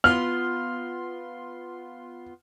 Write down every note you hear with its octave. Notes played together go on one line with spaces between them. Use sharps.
B3 F4 C6 F6